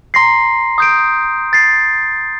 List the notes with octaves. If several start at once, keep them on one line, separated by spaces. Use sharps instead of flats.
A#5 C6 A#6 C7
D#6 G6 D7
A6 C7